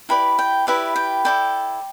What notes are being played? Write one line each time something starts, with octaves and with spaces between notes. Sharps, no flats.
E4 G4 B4 D5 B5
G5
E4 G4 B4 D5 E5
G5
E4 A4 D5 G5